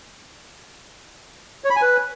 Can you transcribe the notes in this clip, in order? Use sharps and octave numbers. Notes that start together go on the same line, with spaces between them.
C#5
B5
G#5
B4